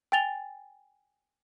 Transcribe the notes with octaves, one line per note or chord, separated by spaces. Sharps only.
G5 G#5 A6 F7 G7